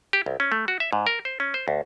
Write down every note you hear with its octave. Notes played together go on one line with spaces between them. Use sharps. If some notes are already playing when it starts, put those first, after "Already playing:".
G4
C2
C#4
A3
F#4
E5
G#2
A#4
C5
C#4
C5
D2